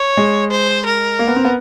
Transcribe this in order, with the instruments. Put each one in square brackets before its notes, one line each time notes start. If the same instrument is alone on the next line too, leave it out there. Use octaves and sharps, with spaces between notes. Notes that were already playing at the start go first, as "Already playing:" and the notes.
Already playing: [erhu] C#5
[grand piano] G#3
[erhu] C5
A#4
[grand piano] A#3
B3
C4
B3